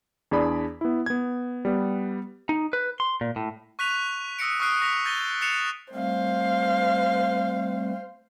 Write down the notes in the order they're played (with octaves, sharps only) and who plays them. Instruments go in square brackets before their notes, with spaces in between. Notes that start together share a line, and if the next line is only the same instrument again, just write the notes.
[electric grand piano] E2 D4 G#4 D5 B5
B3 E4
B3 G#6
G3 B3 B4
[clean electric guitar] D#4
B4
C6
A#2
A2
[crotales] C#6 F#6 B6 D#7 F7
D#6 E6 A#6 C#7 D7
C#6 D#6 F6 F#6 C7 D7
C#6 A#6 B6 F7
G6 A6 A#6 D#7 G7
F#6 A6 C7 C#7 E7 F7
[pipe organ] G3 A3 C4 [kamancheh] C5 F5